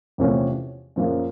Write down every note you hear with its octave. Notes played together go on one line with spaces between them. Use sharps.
E2 C3 F3 A3 C#4
F#2 C#3 F3 A#3